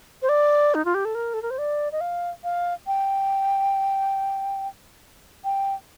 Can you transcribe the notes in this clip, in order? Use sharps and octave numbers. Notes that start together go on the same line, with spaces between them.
C5
D5
D#4
F4
G4
A4
A#4
A4
A#4
C5
D5
D#5
F5
F5
G5
G5